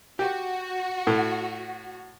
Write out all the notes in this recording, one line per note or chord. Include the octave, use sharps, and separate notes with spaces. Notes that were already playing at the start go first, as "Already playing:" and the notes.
F#4 G4
A2